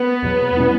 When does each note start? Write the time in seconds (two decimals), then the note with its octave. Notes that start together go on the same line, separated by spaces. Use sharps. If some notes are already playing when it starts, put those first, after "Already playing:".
Already playing: B3
0.22 E2 B2 F#3
0.57 B2 G3 C#4 E4